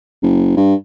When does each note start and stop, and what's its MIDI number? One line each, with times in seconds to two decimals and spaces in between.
0.22 0.56 30
0.57 0.74 43